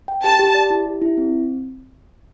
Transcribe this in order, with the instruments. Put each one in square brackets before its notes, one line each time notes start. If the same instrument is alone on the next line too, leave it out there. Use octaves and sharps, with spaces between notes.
[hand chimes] G5
[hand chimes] G4 [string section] A5
[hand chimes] G4
D5
E4
G4
E4
C4